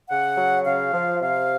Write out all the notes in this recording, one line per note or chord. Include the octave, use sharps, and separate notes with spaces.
C#3 F#5
F#3
C#3 F5
F3
C3 F5